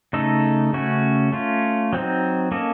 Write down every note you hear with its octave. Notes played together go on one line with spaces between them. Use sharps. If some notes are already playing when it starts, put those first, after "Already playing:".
C#3 A3 D#4 A4
C#3 A3 C#4 F#4
A3 C#4 F4
F#3 C4 D#4
A#3 C#4 A4 D#5